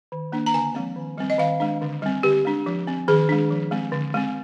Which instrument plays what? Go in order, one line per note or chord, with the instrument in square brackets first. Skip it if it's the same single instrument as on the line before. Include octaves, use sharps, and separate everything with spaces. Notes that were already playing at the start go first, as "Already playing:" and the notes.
[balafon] D#3
A#3 D4
A#5
D3 G#5
F3 G#3 C4
D#3
G3 C4
D#5
D#3 F5
G#3 D4
D3
G3 C4
D3 G4
G#3 D4
F3
C4
D#3 G#4
G#3 D4
F3
G#3 C4
D3
G#3 C4